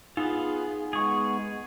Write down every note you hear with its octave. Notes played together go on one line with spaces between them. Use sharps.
B3 D#4 F4 G#4
G#3 B3 G#4 C#6